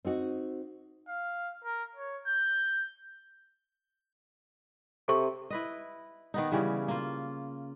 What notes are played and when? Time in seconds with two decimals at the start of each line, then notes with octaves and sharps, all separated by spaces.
0.05 C4 D#4 F#4
1.09 F5
1.64 A#4
1.96 C#5
2.27 G6
5.08 C3 A4 C#6
5.50 E4 B4 D#5
6.34 D#3 B3 D#4
6.52 C#3 E3 G3 C#4
6.88 A#3 F4